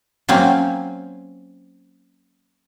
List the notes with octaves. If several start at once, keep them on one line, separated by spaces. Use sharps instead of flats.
F#3 A#3 C4 C#4